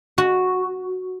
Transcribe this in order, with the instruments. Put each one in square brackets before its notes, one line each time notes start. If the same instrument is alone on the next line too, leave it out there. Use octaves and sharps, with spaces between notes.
[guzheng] F#4